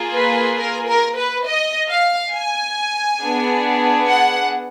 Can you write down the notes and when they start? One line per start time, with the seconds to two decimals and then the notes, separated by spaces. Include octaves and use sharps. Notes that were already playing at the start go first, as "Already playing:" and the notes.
Already playing: A#3 F4 G#4
0.14 B4
0.58 A#4
0.87 A#4
1.17 B4
1.46 D#5
1.90 F5
2.33 G#5
3.21 B3 D4 G#4
4.09 F#5